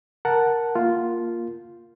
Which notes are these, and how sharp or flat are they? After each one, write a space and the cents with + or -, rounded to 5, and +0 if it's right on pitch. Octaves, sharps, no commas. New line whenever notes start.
A#4 +5 F#5 +0 A5 +0
A#3 +0 F4 +0